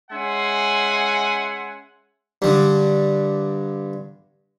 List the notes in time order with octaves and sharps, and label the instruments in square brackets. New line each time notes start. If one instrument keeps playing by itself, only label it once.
[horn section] G#3 C#4 E5 F#5 G#5 C6
[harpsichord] G2 D3